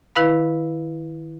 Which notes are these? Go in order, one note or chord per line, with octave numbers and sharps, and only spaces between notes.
D#3 E4 B4 F5 B5